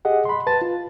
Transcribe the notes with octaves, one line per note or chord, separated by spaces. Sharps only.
G4 G#4 D#5 F#5
B5 C6
B4 A5 A6
F4